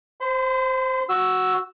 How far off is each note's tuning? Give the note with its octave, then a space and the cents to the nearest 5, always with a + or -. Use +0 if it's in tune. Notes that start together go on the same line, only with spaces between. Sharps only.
C5 +0 C6 -40
F#4 +0 E6 +0